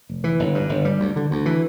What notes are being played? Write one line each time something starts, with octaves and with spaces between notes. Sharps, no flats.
F1
E3
G1
G2
G1
G3
D2
D3
D2
E3